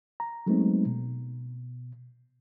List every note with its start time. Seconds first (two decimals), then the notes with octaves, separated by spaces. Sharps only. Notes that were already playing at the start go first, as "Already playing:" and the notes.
0.20 A#5
0.46 F#3 G#3 A3 B3 C4 D#4
0.86 B2